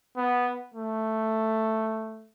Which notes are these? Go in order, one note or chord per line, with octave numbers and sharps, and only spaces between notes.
B3
A3